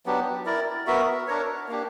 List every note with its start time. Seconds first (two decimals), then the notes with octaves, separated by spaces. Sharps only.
0.06 F#3 B3 D4 G4
0.46 E4 A#4 D5
0.86 B3 F#4 A#4 E5
1.28 D4 A#4 C#5
1.68 A#3 D4 G4